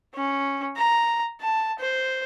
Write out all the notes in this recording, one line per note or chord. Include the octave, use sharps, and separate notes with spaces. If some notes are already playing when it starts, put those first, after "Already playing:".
C#4
A#5
A5
C5